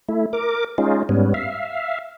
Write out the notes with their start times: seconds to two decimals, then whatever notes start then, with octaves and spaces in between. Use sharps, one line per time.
0.09 A3 E4
0.33 A#4 D6
0.78 G#3 C#4 D#4 F4
1.09 G#2 G3 B3 C#4
1.34 E5 F5